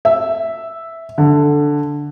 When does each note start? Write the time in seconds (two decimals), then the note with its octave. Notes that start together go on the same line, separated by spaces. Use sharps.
0.05 E5
1.18 D3